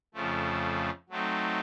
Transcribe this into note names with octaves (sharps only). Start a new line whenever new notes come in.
F2 C#3 F3 A3
F#3 A3 C4 D#4